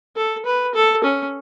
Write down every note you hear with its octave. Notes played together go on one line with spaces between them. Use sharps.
A4
B4
A4
C#4